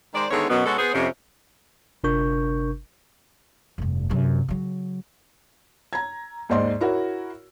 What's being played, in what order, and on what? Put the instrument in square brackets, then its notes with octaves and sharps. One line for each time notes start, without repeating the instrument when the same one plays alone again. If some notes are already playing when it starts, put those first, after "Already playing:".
[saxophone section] D#3 G#3 C5 D5
D3 D#3 G#3 A3 B3 C#5
F#2 B2 B3
B2 G#3 C#4 F#4 A4
B3 G#4 C5
F2 C3 C#4
[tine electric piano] G1 C3 D4 A#4 C#6 G6
[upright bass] F1 G2
F#2 C3
C#3 F#3
[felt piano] A#5 G#6
D#2 G#2 C5 D5 D#5 C6
E4 F#4 A#4 C#5 F#5